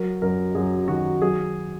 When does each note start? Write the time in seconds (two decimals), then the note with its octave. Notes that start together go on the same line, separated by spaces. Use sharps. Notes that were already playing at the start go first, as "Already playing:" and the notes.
Already playing: F#3 A#4
0.22 F#2 A#4
0.55 F#2 G#4
0.88 D#3 F#4
1.21 F#3 G#4